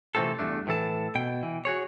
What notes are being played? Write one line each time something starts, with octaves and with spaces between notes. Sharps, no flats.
C3 E3 A3 C4 F4 A4
E2 G2 A3 D4
A2 E3 A4 A5
B2 G5
E3
F#4 G#4 C#5